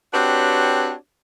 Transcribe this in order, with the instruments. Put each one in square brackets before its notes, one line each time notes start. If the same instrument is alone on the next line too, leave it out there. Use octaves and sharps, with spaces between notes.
[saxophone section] C4 D4 F#4 G4 B4 C#5